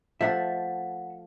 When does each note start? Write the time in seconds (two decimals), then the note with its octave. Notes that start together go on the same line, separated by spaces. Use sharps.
0.21 F3 A3 E5 F#5